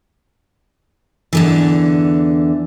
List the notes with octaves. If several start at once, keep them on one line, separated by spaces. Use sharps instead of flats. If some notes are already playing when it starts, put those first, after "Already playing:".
E2 D3 E3